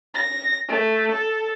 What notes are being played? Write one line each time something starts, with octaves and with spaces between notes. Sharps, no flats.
A#6
A3
A4